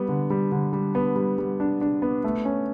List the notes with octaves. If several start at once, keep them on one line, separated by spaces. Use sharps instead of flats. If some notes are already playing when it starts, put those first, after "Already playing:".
Already playing: G3 B3
D3
G3
D3
G3
B3
G3
G3
D4
D4
B3
A3
C#4